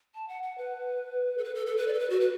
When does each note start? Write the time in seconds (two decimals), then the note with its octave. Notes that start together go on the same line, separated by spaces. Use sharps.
0.14 A5
0.28 F#5
0.43 F#5
0.58 B4
1.38 A4
1.44 B4
1.55 A4
1.66 A4
1.77 B4
1.88 D5
1.93 A4
1.99 B4
2.10 F#4
2.20 B4